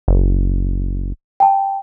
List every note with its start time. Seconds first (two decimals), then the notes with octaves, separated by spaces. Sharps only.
0.08 F#1
1.40 G5 A5